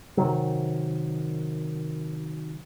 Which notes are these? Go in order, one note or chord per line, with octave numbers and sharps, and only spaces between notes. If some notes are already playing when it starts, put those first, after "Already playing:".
C3 D#3 F#3